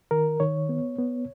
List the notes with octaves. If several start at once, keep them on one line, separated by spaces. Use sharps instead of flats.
D#3 A#4
D#3 C#5
B3
B3